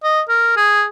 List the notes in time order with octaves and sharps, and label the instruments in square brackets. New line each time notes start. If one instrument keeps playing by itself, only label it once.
[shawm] D#5
A#4
G#4